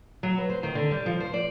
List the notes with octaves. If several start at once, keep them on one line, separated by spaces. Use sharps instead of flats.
F#3
B4
C5
D#3
D3
G3
F3
C5
D5